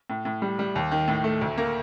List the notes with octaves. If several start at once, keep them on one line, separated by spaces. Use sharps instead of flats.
A2
A2
G3
G3
D#2
D#3
A2
A3
D2
A#3